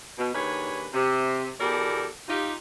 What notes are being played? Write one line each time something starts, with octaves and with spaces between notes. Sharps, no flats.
B2
D#2 D#3 D4 G#4 B4 C#5
C3
E2 B2 G4 A4 A#4 D5
D#4 F4 G4